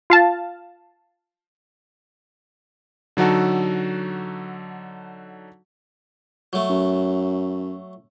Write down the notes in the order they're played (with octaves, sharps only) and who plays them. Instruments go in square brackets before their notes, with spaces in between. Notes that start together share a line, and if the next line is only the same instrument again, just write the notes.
[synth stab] F4 F5 A5
[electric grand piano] D3 F#3 D#4 F#4 A4
[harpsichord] F#3 A3
[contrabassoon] F#2